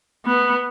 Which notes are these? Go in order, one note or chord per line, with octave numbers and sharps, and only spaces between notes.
B3